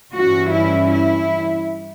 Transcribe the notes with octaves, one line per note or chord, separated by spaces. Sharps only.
G2 E3 G3 C#4 F#4
E4
E4